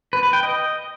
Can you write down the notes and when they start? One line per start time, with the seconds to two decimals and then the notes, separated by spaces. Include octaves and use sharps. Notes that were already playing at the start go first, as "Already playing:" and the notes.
0.13 B4
0.23 B4
0.33 G5
0.43 D#5